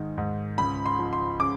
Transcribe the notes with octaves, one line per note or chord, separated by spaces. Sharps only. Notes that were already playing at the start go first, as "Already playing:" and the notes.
Already playing: G#2 D#3 G#3
G#2
C#2 B5
C6
F3
C6
C#3 D6